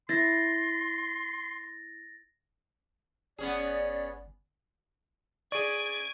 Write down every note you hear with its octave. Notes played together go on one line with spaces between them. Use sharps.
E4 C6 A6 A#6
G1 B3 C#4 G#4 D5
G#4 D5 C#6 G#6 D7 D#7